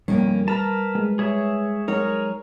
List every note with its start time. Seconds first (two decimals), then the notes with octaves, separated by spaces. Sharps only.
0.08 F2 B2 D#3 G3 A#3 C#4
0.48 A#4 B4 A5 B5
0.95 G#3
1.19 G#4 C#5 E5
1.88 F#3 G#3 D#4 G#4 A#4 C#5